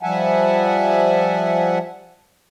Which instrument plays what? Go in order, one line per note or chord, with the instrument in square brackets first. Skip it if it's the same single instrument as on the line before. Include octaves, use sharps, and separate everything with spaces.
[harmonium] F3 G3 E5 F#5 G#5 A5